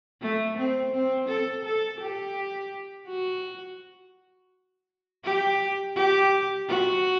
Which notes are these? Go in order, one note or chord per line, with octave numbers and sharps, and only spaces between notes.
A3
C4
C4
A4
A4
G4
F#4
G4
G4
F#4